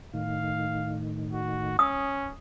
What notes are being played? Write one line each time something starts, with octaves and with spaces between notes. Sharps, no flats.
A2 D#3 F5
F#4
C#4 D#6